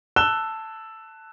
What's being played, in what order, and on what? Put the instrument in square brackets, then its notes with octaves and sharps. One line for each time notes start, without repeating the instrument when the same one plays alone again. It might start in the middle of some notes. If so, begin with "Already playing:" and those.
[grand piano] A5 E6 F#6 E7 G7